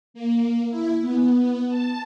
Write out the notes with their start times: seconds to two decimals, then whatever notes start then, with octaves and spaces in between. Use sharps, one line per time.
0.14 A#3
0.70 E4
1.01 B3
1.69 A5